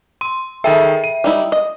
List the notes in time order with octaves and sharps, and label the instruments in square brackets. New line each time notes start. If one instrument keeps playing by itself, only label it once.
[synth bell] C6 [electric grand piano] D#7
[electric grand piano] D#3 G#4 A4 [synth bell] E5 G5
[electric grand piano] D#7
[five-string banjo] G3 D#4 E4
D#5